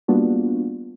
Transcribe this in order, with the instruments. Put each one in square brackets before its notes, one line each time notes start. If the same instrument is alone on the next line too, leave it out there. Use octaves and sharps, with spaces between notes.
[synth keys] G3 A#3 B3 D4 F4 F#4